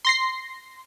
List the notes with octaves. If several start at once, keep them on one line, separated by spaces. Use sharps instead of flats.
C6 A#6 C7